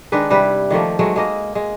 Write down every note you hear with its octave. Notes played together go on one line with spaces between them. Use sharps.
D#3 G#3 D4 B4
C3 G3 E4 B4
D#3 F3 A3 A#3
F#3 G#3 A3
G#3 A#3 D#5
G#3